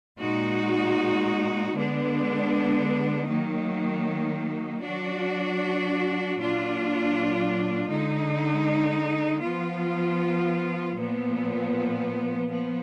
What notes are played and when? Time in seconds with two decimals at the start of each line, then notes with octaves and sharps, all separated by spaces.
0.19 A#2 G#3 D#4 F#4
1.73 D3 G#3 B3 D4
3.26 D#3 F#3 A#3 D#4
4.80 F#3 D4 F#4
6.34 A#2 F#3 D4 F4
7.88 D3 G#3 D#4
9.41 F3 B3 F4
10.95 A#2 F3 B3
12.49 F3 B3